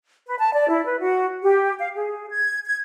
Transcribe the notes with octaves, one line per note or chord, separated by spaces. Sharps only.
B4
A5
D5
E4
B4
F#4
G4
F5
G#4
G#6
G#6